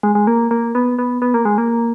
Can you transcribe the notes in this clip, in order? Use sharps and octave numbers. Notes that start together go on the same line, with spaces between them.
G#3
G#3
A#3
A#3
B3
B3
B3
A#3
G#3
A#3